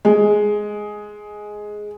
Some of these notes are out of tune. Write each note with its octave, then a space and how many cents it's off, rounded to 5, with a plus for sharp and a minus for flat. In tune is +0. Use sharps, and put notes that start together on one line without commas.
G#3 +5